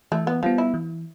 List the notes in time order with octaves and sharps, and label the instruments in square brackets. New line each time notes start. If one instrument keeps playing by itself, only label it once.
[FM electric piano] E3 [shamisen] A3
[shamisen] B3
[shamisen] F3 [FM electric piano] G3 B3
[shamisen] E4
[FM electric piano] E3